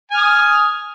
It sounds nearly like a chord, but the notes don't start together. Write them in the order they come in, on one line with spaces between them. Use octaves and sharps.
G#5 F6 D#6